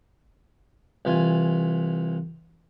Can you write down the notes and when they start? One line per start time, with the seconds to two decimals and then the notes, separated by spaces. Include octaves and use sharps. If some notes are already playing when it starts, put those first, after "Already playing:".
1.05 C2 E3 F4 G#5